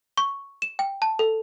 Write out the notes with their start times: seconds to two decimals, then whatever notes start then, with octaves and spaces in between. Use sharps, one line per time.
0.18 C#6
0.62 E7
0.79 G5
1.02 A5
1.19 A4